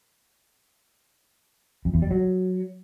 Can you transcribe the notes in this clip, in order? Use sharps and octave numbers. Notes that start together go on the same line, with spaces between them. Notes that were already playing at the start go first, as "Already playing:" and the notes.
F2
E2
G3
F#3